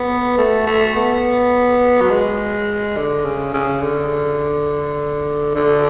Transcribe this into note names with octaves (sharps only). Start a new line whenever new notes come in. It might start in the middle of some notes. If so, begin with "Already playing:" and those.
Already playing: B3
A3
A3
B3
F#3
G#3
D3
C#3
C#3
D3
D3